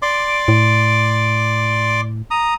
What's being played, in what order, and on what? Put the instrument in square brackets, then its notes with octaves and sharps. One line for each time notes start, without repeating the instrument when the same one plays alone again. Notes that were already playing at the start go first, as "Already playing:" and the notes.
[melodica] D5 C6 D6
[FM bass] A2
[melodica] A#5 D#6